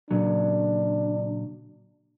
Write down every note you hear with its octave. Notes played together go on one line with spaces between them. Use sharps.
A#2 C#3 F#3 D4